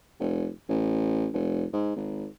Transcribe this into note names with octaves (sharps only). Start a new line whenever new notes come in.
F1
A1
F1
G#2
G#1